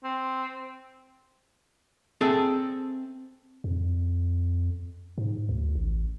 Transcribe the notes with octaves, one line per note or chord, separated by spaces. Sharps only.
C4
C4 G#4 A4 E5
F2
G#2
D2
A1